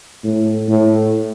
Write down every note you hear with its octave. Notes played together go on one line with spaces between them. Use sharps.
A2
A2